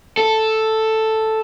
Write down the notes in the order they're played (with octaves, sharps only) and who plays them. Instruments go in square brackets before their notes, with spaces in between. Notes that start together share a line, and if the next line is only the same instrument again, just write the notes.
[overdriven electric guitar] A4